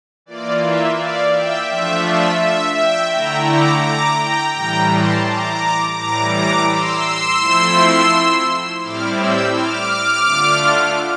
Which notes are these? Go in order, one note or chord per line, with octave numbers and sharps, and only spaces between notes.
E3 A#3 F4 D5
E5
D5 F5
E5 G5
F3 A3 D4 F4 E5
E5
E5
E5 G5
D3 A3 E4 G5 A#5
A#5 D6
A#5 D6
G5 A#5
A2 E3 G3 G5 A#5
A5 C6
A#5 D6
A2 E3 G3 A#5 D6
A#5 D6
C6 E6
F3 A3 C4 E4
A2 G3 C4 E4 D6 F6
E6 G6
D6 F6
D3 A3 D4 F4